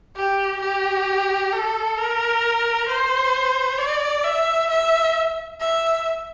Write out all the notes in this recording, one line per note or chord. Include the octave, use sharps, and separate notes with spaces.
G4
G4
A4
A#4
C5
D5
E5
E5
E5